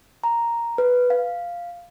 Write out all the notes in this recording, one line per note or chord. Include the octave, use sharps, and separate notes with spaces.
A#5
B4
F5